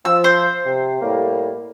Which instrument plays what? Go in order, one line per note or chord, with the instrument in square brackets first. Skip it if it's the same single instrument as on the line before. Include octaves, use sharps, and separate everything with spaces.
[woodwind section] F3 [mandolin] E6
[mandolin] C5
[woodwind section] C3
A2 G3 A#3